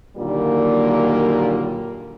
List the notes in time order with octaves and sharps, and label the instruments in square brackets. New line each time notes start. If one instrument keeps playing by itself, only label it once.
[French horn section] A#2 D3 D#3 F#3 G3 A#3